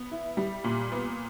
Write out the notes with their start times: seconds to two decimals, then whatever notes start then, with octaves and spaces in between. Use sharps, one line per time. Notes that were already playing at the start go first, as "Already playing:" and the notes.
Already playing: B3
0.11 E4
0.37 G3
0.64 A#2
0.92 B3